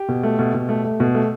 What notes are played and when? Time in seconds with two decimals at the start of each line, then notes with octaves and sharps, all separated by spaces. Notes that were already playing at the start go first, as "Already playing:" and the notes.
Already playing: G4
0.08 B2
0.23 A3
0.39 B2
0.54 B2
0.69 A3
0.84 A3
1.00 B2
1.15 A3